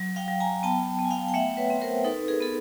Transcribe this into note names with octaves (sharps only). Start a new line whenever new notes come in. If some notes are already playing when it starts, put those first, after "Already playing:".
Already playing: F#3
F5 G5
F#3
G#5 A#5
B3 G5 A5
B3
G#5
F5 G5
G5
A3 E5 F#5
B4 C#5
C4
A#4 C5
D#4 A4 B4
G#4 A#4
B3 A4